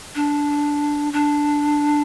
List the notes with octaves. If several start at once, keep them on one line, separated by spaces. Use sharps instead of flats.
D4
D4